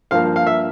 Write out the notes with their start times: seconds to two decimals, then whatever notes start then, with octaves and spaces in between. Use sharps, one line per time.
0.11 G2 F3 A#3 F5
0.36 F5
0.47 E5